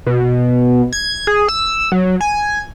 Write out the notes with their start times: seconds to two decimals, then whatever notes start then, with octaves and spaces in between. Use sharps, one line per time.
0.06 B2
0.93 G#6
1.27 G#4
1.49 E6
1.92 F#3
2.21 G#5